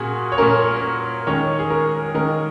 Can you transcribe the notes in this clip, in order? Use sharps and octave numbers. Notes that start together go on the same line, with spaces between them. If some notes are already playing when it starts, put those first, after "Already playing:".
Already playing: A#2 C#4 F#4 G#4
C#5
A#2 A#3 C#4 A#4
D#3 G#3 C#4 C#5
G#4
A#4
D#3 G#3 C#4 A#4